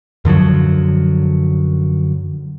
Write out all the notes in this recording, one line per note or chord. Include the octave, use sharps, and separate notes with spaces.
F#2 D3 F3 F#3